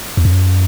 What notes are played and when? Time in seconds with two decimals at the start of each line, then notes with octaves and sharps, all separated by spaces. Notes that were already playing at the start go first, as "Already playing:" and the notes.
0.17 E2
0.25 F2
0.32 F#2